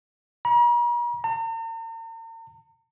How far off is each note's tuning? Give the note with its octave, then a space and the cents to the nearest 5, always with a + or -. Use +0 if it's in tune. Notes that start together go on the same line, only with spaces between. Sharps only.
A#5 +45
A#5 -45